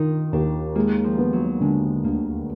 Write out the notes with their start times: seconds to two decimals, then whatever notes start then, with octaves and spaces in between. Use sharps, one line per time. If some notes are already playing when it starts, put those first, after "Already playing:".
Already playing: D#3 D#4 F4
0.33 D#2 D4
0.75 G#3 A#3
1.04 F3
1.18 B3
1.33 F#3
1.61 D3 G#3
2.04 D2 A#3